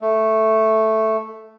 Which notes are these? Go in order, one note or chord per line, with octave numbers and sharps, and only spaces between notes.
A3